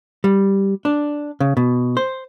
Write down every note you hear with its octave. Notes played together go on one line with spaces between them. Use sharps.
G3
D4
C#3
B2
C5